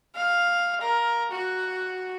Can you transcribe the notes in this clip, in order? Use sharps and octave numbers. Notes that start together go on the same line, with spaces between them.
F5
A#4
F#4